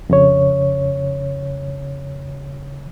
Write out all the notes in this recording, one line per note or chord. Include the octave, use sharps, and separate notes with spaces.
F2 C#3 C#5